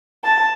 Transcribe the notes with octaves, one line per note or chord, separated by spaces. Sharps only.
A5